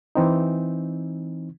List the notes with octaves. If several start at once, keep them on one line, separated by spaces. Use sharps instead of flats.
E3 C4 D#4